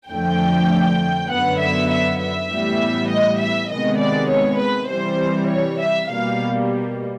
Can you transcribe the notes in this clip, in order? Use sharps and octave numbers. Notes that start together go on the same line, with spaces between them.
F2 D3 F3 A3 G5
F#2 D3 F#3 B3 F#5
E5
E5
E5
A2 E3 G3 B3
D#5
E5
C3 D#3 G#3 B3 D#5
D5
C#5
B4
C3 E3 G3 C5
C#5
E5
B2 G3 A#3 F5